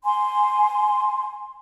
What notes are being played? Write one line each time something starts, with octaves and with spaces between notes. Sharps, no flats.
G#5 C6